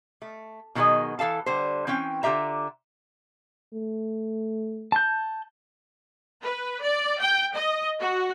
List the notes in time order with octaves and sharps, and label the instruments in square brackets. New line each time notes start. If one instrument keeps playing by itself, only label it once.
[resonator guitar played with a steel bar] A3
B2 D#3 F#3 G3 G#4 D#5
E3 A4 F5 A5
D3 G3 C5
E3 C4 C#4 G5
D3 F4 G4 E5 A#5
[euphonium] A3
[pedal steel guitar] A5 G6
[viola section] B4
D5
G5
D#5
F#4